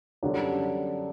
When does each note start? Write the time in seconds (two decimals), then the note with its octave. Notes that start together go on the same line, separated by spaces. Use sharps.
0.23 F#2 D3 G3 D4 G4